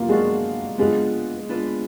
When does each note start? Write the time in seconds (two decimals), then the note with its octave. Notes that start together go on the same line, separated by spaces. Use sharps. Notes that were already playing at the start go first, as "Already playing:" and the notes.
Already playing: A#3 F4
0.09 G#3 B3 D4 F#4 D5 F5
0.78 G#3 B3 D4 F4 B4
1.49 B3 D4 F4 B4